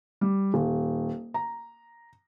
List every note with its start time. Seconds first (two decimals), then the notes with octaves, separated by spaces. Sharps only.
0.21 G3
0.54 D#1
1.34 A#5